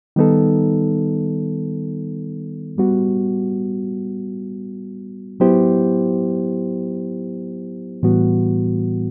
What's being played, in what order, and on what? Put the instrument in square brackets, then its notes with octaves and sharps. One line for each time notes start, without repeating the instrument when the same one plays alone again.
[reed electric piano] D#3 G3 B3 D#4 A4
G3 B3 F#4
F#3 B3 E4 G4 C5
A2 E3 G3 B3 F#4